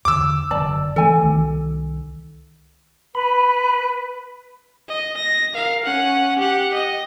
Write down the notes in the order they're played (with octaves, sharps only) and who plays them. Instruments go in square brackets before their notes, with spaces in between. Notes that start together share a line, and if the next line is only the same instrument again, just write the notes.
[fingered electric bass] E2 D3 [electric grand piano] D6 E6
[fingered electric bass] F#1 D3 [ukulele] D5 A5
[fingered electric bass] E3 G#3 A3 [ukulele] A4 G#5
[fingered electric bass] C2 D#3
[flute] B4 [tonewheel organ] B5
[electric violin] D#5
A#6
A#4 F5
C#4 F#5
G4 F#5
D#5